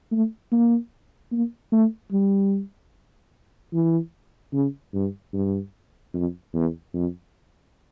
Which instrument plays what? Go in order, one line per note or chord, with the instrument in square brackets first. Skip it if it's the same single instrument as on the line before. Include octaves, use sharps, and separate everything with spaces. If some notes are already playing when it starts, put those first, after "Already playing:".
[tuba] A3
A#3
A#3
A3
G3
E3
C#3
G2
G2
F2
E2
F2